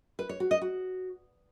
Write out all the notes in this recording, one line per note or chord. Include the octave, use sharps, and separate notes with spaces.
B4
C#5
F#4
D#5
F#4